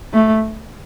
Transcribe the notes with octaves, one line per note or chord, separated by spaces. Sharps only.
A3